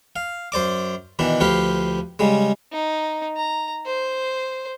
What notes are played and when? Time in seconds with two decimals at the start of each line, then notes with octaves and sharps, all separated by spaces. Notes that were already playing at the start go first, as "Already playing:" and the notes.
0.16 F5
0.52 F#2 C5 D5 D6
1.19 B2 D#3 E3 D4
1.40 D2 F3 G4 B4 F5
2.19 C#3 G3 G#3
2.72 D#4
3.36 A#5
3.86 C5